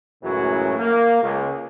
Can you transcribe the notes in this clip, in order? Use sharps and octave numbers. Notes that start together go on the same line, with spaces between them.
C#2 F#2 A2 C#3 E3 F#3
A#3
C#2